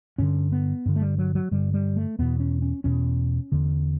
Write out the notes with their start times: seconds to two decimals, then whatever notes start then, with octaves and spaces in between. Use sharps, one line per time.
0.18 G2 D3 C#4
0.52 B3
0.86 G2 D3
0.96 A3
1.01 G3
1.18 F#3
1.35 F#3
1.51 G2 D3 G3
1.74 G3
1.96 A3
2.19 E2 B2 B3
2.40 C#4
2.62 C#4
2.84 E2 B2 C#4
3.52 E2 D3